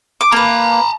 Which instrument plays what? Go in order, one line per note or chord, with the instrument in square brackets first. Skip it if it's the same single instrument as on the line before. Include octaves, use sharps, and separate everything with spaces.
[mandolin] D6
[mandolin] A#3 B4 [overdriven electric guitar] A5 A#5